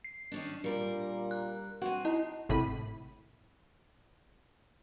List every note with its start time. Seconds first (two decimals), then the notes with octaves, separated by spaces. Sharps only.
0.04 C7
0.32 D#3 C#4 D4
0.64 A#2 G3 A#4
1.31 F#6
1.81 C4 F#4 G#5
2.05 D#4 E4
2.49 G#1 A2 C3 B5 D#7